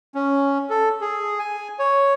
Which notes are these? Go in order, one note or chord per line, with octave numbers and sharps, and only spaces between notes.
C#4
A4
G#4
G#5
C#5